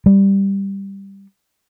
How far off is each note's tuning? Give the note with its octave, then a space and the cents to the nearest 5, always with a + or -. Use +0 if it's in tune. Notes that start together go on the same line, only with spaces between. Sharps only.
G3 +5